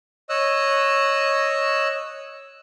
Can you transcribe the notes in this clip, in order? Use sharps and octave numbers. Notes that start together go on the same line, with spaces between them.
C#5 D#5 E6 F#6